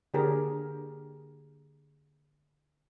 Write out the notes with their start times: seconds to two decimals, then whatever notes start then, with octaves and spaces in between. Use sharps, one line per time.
0.14 D3 A#3 G4 G#4 A#4